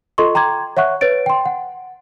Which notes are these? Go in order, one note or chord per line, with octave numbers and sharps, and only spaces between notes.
F4 A4 D#5 C6 C#6
G5 A#5 C6 D6 G#6
C#5 E5 F#5 C#6 F#6
B4 C#5 A6 D7
G5 C6
F#5